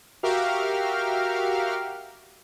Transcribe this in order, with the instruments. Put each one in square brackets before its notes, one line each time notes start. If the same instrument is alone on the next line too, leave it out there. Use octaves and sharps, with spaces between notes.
[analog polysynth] F#4 G4 A#4 E5 F5 F6